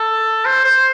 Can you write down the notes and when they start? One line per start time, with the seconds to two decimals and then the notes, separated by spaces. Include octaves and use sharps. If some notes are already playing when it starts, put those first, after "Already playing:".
Already playing: A4
0.46 C5
0.65 C5